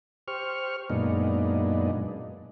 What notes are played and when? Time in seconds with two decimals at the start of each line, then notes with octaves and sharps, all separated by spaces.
0.28 G4 C5 C#6 F6
0.90 F#2 A#2 G#3 B3 D4 D#4